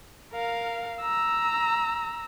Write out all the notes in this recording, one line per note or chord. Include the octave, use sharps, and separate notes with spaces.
A#4 F5
A#5 E6